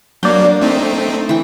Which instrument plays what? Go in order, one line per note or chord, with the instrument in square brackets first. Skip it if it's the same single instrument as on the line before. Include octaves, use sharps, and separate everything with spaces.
[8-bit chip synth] F#3 A#3 [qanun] D4 [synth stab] D5 G6
[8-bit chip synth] A3 C4 D#4
[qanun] E3 G5